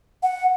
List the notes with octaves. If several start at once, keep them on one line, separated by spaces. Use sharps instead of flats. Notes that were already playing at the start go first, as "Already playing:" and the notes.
F#5